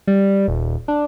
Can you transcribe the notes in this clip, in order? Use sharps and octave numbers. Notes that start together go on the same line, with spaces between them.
G3
D#1
D4